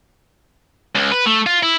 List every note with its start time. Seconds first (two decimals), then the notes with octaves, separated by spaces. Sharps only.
0.95 C#2
1.12 B4
1.26 A3
1.46 F4
1.63 E4